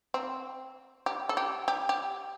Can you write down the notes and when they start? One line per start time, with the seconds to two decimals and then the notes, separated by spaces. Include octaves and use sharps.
0.14 C4
1.06 G4
1.29 A4
1.37 G4
1.68 G4
1.89 G4